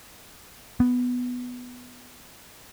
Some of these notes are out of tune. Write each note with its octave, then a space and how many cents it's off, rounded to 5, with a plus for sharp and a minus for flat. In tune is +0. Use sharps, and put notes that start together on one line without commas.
B3 +5